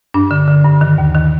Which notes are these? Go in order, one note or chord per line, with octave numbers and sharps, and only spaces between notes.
G2 D4
D3
D3
G2
D#3
D#2
D#3